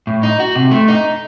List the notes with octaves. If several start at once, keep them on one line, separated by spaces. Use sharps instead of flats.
A2
D#4
F#4
C3
A3
D#4